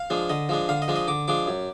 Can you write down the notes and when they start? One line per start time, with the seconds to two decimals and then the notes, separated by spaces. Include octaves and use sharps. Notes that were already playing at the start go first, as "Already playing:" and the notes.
Already playing: F5
0.10 F3 G#3 D4
0.29 D3 D#5
0.49 F3 G#3 D4
0.69 D3 F5
0.82 D#5
0.88 F3 G#3 D4
0.96 D#5
1.08 D3 D6
1.28 F3 G#3 D4 D6
1.47 F#2